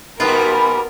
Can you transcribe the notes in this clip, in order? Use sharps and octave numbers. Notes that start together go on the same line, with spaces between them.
G#2 B2 G3 B3 F4 A#4 B5